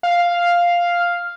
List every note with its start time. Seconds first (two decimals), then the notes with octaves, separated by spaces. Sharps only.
0.03 F5